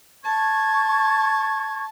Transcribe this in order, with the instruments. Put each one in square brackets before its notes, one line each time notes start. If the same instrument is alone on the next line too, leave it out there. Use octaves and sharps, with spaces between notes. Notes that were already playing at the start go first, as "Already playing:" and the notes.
[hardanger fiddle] A5 [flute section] C#6 G#6